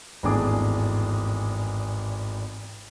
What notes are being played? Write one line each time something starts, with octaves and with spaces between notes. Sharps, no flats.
G#1 E2 A2 D4 G#4 D6